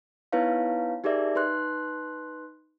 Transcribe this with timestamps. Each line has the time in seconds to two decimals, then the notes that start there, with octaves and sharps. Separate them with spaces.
0.32 B3 D#4 E4 B4 C#5 F5
1.04 D#4 G4 G#4 A#4 D5 E5
1.35 D#4 B4 C6 F#6